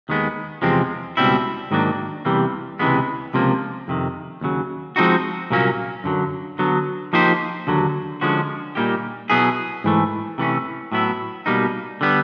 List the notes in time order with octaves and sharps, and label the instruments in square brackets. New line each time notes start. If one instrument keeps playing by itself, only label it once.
[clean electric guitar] D#2 D#3 G#3 B3
E2 C3 F3 G#3 C4
C#2 B2 G3 C4 E4
G#2 D#3 F#3 A#3 D4
E2 C3 E3 G3 A#3
C#2 C3 E3 G#3 B3
C#2 C3 F3 A#3
F2 C3 D#3
D#2 C#3 F#3
F3 G#3 C4 D#4 F#4
C2 A#2 F#3 A#3 C#4
F#2 D3 F#3
D3 F#3 B3
F3 A#3 D#4 G4 C5
D#2 D3 F#3
D3 F3 G#3 C#4 F#4
A#2 G3 A#3 D#4 G4
B2 F#3 B3 E4 G#4
G#2 E3 A3
C3 E3 A3 C#4
A2 F#3 B3 E4
B2 G3 A#3 D#4
D3 G3 B3